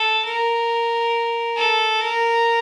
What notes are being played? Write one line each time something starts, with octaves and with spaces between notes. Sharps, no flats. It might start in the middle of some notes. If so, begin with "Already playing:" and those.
Already playing: A4
A#4
A4
A#4